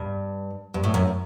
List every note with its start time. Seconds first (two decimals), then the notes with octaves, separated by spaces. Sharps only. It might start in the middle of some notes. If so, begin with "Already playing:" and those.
Already playing: G2
0.74 G2
0.84 A2
0.94 F#2